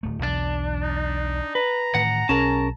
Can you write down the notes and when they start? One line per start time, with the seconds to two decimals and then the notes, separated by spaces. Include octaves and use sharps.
0.03 D1 A3
0.23 B1 E2 D4
0.83 D#4
1.55 B4 A#5
1.95 A2 D#3 E3 F#5
2.29 B1 C#4 G#4 A#4 A5